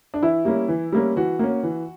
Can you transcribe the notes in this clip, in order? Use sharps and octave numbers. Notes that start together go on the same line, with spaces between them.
D4
E3 E4
G3 A#3 C#4
E3
G3 A#3 C#4
E3 F#4
A#3 C#4
E3